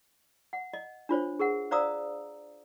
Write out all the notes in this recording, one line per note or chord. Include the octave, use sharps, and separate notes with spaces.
F#5
D#5
D4 F4 C5 C#5
G#4 A#4 F#5
C5 D5 F5 A#5 D#6 E6